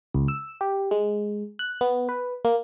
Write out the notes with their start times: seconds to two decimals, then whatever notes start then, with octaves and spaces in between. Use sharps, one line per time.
0.14 C#2
0.28 E6
0.61 G4
0.91 G#3
1.59 F#6
1.81 B3
2.09 B4
2.45 A#3